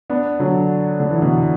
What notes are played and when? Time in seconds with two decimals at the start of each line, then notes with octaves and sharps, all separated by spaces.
0.10 B3 D4
0.40 D3 F#3
1.00 D3
1.11 E3
1.22 B2 D3